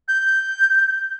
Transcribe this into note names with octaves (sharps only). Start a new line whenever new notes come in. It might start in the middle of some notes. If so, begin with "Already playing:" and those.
G6